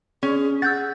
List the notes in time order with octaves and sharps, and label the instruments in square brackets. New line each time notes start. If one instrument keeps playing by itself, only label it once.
[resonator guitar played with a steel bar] C#4 [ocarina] G#4
[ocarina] G#4 [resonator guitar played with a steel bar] F#5 [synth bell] E6 G6 A6